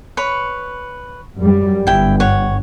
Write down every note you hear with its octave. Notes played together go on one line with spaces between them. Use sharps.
B4 C#5 B5
F#2 G3
G1 E4 G5
C#5 F#5